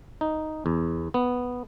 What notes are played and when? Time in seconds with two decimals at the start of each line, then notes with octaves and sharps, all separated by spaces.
0.21 D#4
0.66 E2
1.14 B3